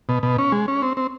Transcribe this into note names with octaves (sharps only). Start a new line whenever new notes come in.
B2
B2
C#4
G#3
C#4
C4
C4